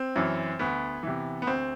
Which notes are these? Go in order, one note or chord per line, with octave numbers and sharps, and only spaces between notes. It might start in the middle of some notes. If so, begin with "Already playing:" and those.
Already playing: C4
F#2 E3
D2 B3
C3 E3
B3
D2 C4